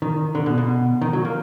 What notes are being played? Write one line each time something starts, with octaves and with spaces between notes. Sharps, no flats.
D#3
D3
B2
B2
D#3
F#3
A#3